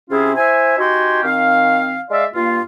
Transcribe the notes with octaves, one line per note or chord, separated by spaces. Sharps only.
C3 C#4 E4 F4 G#4
E4 C5 E5 G#5
D#4 F#4 G4 G#5 C6
D#3 C4 F5
G#3 D5 E5 F5
G2 A#3 F4